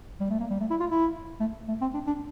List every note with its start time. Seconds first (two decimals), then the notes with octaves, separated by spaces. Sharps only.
0.20 G3
0.30 A3
0.40 A#3
0.50 G3
0.60 A3
0.70 E4
0.80 F4
0.91 E4
1.40 A3
1.68 A3
1.81 C4
1.94 D4
2.07 D4